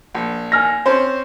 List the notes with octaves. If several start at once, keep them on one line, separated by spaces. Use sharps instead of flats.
A#1
G#5 F6 A#6
C4 C#4 C5